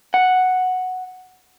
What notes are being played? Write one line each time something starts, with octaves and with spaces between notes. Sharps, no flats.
F#5